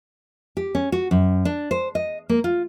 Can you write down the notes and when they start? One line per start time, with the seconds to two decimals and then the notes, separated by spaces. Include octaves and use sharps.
0.57 G4
0.75 C#4
0.92 F#4
1.11 F#2
1.45 D4
1.71 C5
1.95 D#5
2.29 A#3
2.44 F4